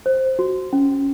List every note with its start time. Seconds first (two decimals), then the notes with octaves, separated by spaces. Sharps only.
0.06 C5
0.39 F#4
0.73 C#4